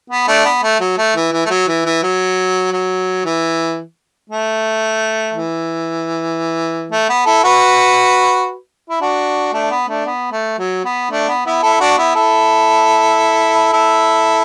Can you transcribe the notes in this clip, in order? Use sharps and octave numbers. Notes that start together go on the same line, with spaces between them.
B3
A3 D4
B3
A3
F#3
A3
E3
E3
A3
F#3
E3
E3
F#3
F#3
E3
A3
E3
A3
B3
E4 A4
F#4 B4
E4
D4 F#4
A3 D4
B3
A3 D4
B3
A3
F#3
B3
A3 D4
B3
B3 E4
E4 A4
D4 F#4
B3 E4
E4 A4
E4 A4